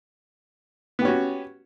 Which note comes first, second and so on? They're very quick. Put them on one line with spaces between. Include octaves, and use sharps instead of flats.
B3 G4 C#4 F#4